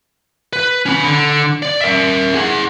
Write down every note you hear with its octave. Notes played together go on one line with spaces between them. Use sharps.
B4
C#4 B5
D3
D5
A#4 E5
G#4 F#5